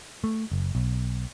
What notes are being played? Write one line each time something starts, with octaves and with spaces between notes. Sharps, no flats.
A3
F#1
B1